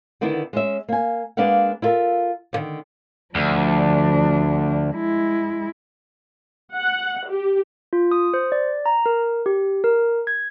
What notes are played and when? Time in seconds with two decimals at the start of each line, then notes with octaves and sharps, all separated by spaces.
0.21 D3 D#3 B3 D4 E4
0.53 G#3 C#4 E5
0.89 A#3 G#5
1.37 G#3 A#3 D4 B4 F5 F#5
1.82 E4 F4 A4 A#4 E5
2.53 D#2 D3 D#3
3.35 D2 F3 D4
4.94 G#3 E4
6.76 F#5
7.30 G4
7.93 F4
8.11 D#6
8.34 C5
8.52 D5
8.86 A#5
9.06 A#4
9.46 G4
9.84 A#4
10.27 G#6